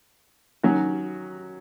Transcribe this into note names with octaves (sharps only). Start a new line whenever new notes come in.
D#3 F#3 C#4 F#4